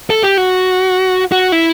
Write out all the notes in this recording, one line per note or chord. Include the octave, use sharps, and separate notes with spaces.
A4
G4
F#4
F#4
E4